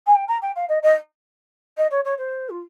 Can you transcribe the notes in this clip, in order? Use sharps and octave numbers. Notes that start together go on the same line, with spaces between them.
G#5
G5
A#5
G5
F5
D#5
D#5
D#5
C#5
C#5
C5
F4